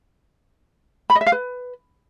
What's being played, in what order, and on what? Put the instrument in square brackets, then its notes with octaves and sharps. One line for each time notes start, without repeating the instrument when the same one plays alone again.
[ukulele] B5
D#5
E5
F5
B4